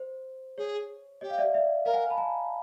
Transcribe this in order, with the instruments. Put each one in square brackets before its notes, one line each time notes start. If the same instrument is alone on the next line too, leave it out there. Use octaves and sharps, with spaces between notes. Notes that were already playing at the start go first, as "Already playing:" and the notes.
Already playing: [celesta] C5
[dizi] G#4 [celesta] C#5
[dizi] G4 [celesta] C#5 D#5
[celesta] F5
D5 E5
D5 E5
[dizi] A#4 [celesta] D#5 F5
[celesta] F#5 G#5
A5 B5
G#5 A#5